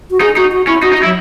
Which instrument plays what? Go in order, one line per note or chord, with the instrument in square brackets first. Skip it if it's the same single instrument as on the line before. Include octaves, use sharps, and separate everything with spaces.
[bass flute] F#4
[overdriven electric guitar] D#4 [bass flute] G#4
[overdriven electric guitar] D#4 [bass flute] F#4
[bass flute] F#4
[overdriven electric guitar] C#4 [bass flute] E4
[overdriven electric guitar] D#4 [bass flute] F#4
[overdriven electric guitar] D#4
[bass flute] F#4
[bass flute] F#3 [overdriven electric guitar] E4